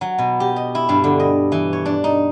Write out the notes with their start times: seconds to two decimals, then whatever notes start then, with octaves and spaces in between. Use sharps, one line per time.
0.01 F#3
0.18 B2
0.40 G4
0.56 D#5
0.75 E4
0.89 G2
1.04 D3
1.20 D#5
1.52 E3
1.73 C#5
1.85 D4
2.04 D#4